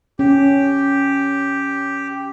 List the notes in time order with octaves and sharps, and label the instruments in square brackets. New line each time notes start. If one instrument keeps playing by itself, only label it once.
[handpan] C#4 [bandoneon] G4